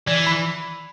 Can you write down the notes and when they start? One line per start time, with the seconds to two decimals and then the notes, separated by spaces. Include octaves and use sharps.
0.07 E3 D5
0.27 B5